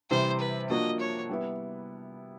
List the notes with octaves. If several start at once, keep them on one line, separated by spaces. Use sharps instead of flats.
C3 E3 G3 C5
B4
F3 A#3 D4 F#4 D#5
C#5
G3 B3 E4